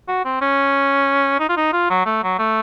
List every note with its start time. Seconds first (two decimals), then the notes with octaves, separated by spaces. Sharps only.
0.08 F#4
0.25 C4
0.41 C#4
1.40 D#4
1.49 F4
1.57 D#4
1.73 F4
1.90 F#3
2.06 A3
2.23 F#3
2.39 A3